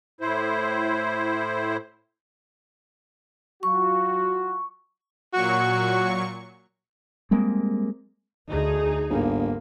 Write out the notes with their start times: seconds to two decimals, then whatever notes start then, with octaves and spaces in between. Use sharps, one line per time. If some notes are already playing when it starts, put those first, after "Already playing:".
0.21 A2 E4 C5
3.63 F#3 F4 F#4 C#6
5.33 A#2 F#3 F#4 C#6
7.31 G3 G#3 A#3 C4
8.49 D2 D#4 G#4
9.10 G1 G#2 A#3